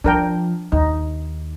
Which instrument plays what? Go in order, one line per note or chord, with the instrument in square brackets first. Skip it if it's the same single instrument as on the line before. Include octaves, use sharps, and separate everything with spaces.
[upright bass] F3 [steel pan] D4 A#4 G5
[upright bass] D#2 [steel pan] D#4